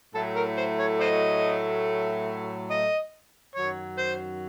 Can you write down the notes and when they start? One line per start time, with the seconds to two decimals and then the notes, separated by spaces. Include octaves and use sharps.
0.15 A2 F#3 A3 A4
0.36 A#4
0.57 C5
0.79 C#5
1.00 C5 D#5
2.70 D#5
3.56 F#2 D#3 F#3 C#5
3.98 C5